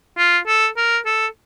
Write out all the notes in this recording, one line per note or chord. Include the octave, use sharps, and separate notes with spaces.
F4
A4
A#4
A4